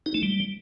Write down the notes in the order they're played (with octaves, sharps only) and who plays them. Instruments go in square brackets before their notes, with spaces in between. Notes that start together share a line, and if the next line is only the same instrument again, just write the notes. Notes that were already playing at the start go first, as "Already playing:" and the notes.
[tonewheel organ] D#4
A3
G3